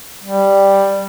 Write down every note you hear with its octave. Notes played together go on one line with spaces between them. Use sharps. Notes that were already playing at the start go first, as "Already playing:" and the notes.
G3